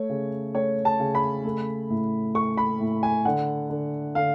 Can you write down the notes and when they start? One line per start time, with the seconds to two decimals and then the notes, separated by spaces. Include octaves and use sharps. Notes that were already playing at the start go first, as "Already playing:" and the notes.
Already playing: A3 C#5
0.09 C#3
0.55 A3 C#5
0.85 A5
1.00 C#3
1.15 B5
1.45 A3
1.90 A2
2.35 A3 C#6
2.58 B5
2.80 A2
3.03 G#5
3.25 D3 F#5
3.70 D3
4.15 D3 F5